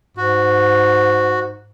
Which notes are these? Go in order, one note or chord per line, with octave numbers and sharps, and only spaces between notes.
G#2 F#4